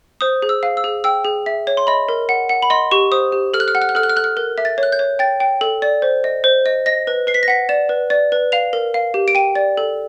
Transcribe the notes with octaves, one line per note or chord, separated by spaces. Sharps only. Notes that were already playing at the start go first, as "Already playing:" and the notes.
C5 D#6
G#4
E6
F5
E6
G#4
G5 E6
G#4
E5
C#5
C6
D#5 B5
A#4
F#5
F#5
B5
D#5 C6
G4 C#6
C5 D#6
G4
A4 F6
F#6
F6
F#5 F#6
F6
F#6
A4 F6
F#6
F6
A4 F#6
F6
A#4 F#6
E5
A6
C#5
F#6
G6
C#5
G5 A6
G5
A4
D5
C5
D#5
C5
D#5
D#5 A#6
B4
B4 C7
B6
A#6
F#5 B6
D5 E7
B4
D5
B4
F5 F7
A#4
F5
G4
D7
G5 D#7
D5
A4